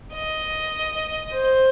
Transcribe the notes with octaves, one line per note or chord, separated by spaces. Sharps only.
D#5
C5